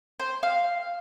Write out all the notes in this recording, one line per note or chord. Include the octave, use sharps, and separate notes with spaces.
C5
F5